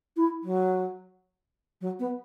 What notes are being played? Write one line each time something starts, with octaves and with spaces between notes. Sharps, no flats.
E4
F#3
F#3
B3